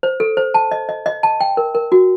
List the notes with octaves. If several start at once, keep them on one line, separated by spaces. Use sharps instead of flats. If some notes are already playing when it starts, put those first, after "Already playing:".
C5
A4
C5
A5
D#5
D#5
D#5
A5
G5
A#4
A#4
F#4